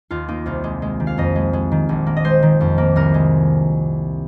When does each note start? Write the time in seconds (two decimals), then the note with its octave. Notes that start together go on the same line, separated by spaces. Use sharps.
0.11 D#2 F4
0.28 A#3 D#4
0.46 C2 F4
0.64 G#3
0.82 G#3
1.00 D#3
1.07 F5
1.18 F2 D#5
1.36 G#3
1.53 G#3
1.72 D#3
1.89 A#1
2.07 A#3
2.17 D#5
2.24 G#3 C5
2.43 D#3
2.61 F2
2.78 A#3
2.96 C2 A#4
3.14 G#3